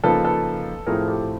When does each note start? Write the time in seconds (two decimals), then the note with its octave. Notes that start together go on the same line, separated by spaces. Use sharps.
0.04 C#3 F3 A#3 D#4 A4 B4
0.25 A4 B4
0.86 A2 F3 A3 C4 E4 G#4 A#4
1.08 G4 A4